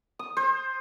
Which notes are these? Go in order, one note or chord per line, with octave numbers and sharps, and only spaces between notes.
D#6
C5